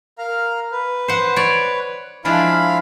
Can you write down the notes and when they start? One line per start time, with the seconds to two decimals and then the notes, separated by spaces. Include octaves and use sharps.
0.18 A#4 F5 A#5
0.72 B4
1.08 C5 F#5
1.36 C#5 D5
2.25 F3 G#3 D4 E4 F5 B5